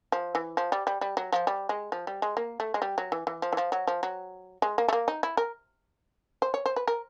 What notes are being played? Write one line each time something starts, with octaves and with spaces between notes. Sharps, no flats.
F3
E3
F3
G3
G3
G3
F#3
F3
G3
G#3
F3
G3
G#3
A#3
A3
G#3
G3
F#3
E3
E3
F3
E3
F3
F#3
F3
F#3
G#3
A#3
A3
A#3
D#4
E4
A#4
C5
C#5
C5
B4
A#4